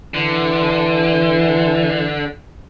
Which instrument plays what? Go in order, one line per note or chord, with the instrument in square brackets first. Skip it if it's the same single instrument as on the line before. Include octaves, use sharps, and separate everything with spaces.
[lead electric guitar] D3 [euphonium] E3